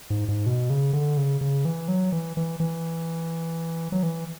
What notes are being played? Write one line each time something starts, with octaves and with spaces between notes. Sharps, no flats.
G#2
G#2
B2
C#3
D3
C#3
C#3
E3
F#3
E3
E3
E3
F#3
E3